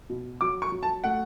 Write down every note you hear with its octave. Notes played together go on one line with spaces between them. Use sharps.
B2
F#3 D6
C#6
F#3
A5
A3 F#5